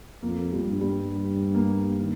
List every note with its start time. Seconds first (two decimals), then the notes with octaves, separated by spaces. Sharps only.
0.22 F2 A#3
0.52 G3
0.67 G2
0.81 G3
1.54 A#3
1.99 D#3